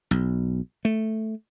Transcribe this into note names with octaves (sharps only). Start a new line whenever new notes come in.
B1
A3